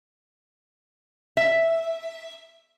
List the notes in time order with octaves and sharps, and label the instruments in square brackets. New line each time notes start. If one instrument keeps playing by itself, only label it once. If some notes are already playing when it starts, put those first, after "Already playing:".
[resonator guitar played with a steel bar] E5